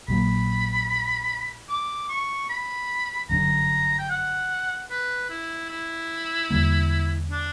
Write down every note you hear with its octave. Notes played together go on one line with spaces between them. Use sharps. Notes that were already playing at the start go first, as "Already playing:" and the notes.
A#1 A#2 F#3 A#3 B5
D6
C#6
B5
G1 F#2 D3 A#5
G5
F#5
B4
E4
E4
E2 D3 G3 A#3
D4